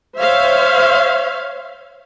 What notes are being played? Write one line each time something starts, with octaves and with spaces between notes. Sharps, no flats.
C5 C#5 E5 F5